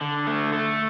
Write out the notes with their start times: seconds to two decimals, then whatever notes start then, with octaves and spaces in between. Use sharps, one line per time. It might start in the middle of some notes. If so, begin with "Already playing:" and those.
0.01 D3
0.27 A3
0.53 A3